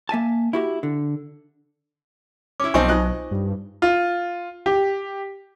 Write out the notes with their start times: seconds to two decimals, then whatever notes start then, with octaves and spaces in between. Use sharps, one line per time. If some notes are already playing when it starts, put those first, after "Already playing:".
0.09 A#3 E5 G#5 A5
0.53 E4 F#4 G4
0.83 D3
2.60 C#4 E4 D6
2.74 B1 F3 C4 D#4 G#5 C#6
2.88 D#4 F4 C5 D#5 F#6
3.31 G2
3.82 F4
4.66 G4